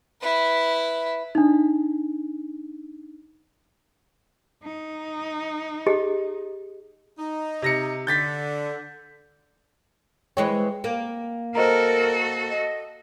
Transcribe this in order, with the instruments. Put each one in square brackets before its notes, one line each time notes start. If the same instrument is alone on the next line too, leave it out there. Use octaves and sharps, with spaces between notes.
[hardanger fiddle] E4 B4
[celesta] D4 D#4
[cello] D#4
[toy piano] G4 G#4 D#5
[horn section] D#4
[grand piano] C3 A#6 C#7
[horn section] D3 [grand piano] G6 A6 B6
[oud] E3 G#3 C#5 [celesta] G5 C#7
[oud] A#3
[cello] F#4 A4 [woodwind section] A#4 [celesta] C5 D#5 A#5
[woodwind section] D#5